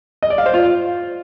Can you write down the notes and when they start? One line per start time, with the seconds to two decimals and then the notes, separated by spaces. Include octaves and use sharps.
0.23 D#5
0.30 D5
0.38 F5
0.46 C5
0.54 F4